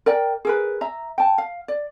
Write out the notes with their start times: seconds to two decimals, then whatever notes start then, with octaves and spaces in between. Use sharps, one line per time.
0.06 A#4 D5 G5
0.45 G#4 A#4 B4
0.81 E5 A#5
1.18 G5 A5
1.38 F5
1.68 D5